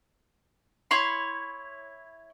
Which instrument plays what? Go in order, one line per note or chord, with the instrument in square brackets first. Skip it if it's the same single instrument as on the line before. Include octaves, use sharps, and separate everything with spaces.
[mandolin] E4 C#5 C6